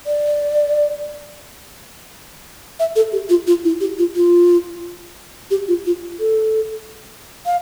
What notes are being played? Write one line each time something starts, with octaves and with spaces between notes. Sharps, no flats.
D5
E5
A4
G4
F4
F4
E4
G4
F4
F4
G4
F4
F4
A4
F5